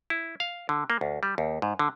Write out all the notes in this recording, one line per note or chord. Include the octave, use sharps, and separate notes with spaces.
E4
F5
D3
A#3
D2
G3
D#2
G#2
D3